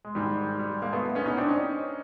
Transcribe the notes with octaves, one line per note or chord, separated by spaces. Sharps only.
G#3
G#2 D#3 G3
G3
G#3 A#3
A3 B3
B3 C#4
C#4 D#4
C4 D4
C#4 D#4